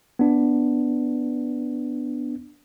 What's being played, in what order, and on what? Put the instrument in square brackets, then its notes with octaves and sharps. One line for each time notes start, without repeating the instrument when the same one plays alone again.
[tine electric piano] B3 D4